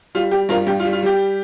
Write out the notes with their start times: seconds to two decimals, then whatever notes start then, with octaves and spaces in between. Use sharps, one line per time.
0.15 G3 F4
0.31 G3 G4
0.49 G2 F4 A#4
0.67 G2 G4
0.80 F4
0.85 G3
0.93 F4
1.03 G3 G4